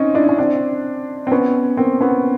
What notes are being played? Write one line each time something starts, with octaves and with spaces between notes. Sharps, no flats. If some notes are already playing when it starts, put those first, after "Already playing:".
Already playing: C4 C#4 D#4
D4 E4
C#4
C4 D4
C4
B3 C#4
A#3 C4
B3 C#4